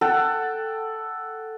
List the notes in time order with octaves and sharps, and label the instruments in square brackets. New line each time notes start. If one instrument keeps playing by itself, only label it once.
[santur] A4 F#5 G5 A5